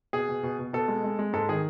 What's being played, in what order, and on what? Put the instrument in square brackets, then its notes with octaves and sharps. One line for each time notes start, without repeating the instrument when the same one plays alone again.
[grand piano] B2 G#4
B2
B2
B2
B2 A4
G#3
G#3
G#3
G#2 A4
D#3 G#4